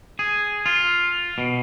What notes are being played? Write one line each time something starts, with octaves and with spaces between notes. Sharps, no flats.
G#4
F4
B2